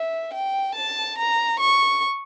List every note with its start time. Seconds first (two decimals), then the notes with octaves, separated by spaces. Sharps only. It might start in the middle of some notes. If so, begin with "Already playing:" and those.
Already playing: E5
0.34 G5
0.75 A5
1.18 A#5
1.59 C#6